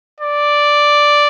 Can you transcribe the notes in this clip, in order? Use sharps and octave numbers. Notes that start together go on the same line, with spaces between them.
D5